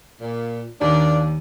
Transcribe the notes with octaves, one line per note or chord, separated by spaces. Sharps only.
A#2
D#2 A#3 D4